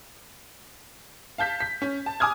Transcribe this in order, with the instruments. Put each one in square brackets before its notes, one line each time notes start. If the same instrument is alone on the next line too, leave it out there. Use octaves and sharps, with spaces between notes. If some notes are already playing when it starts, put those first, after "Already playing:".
[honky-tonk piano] F5 A5 G6 B6
B6
C#4
A5
G#5 D6 D#6 F6 G#6